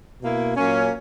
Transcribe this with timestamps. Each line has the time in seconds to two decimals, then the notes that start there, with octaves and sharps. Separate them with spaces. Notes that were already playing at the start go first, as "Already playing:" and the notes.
0.21 B2 A#3 E4
0.56 A#2 F#3 A#3 C#4